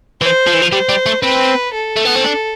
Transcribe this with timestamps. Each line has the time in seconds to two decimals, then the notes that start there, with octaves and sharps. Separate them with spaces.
0.21 E3 C5
0.47 F3
0.54 E3
0.62 F3
0.72 G3 C5
0.89 G3
1.06 A3
1.23 C4 B4
1.74 A4
1.96 A3
2.05 B3
2.15 C4
2.24 D4